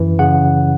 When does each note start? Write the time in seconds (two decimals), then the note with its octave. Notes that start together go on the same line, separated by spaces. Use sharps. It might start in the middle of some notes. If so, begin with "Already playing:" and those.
Already playing: F#2 E3
0.19 C#3 F#5